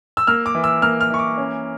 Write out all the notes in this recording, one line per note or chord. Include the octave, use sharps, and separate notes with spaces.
E6
A#3 F6
D6
E3
E6
A#3 F6
F6
E3 C#6
D6
C#4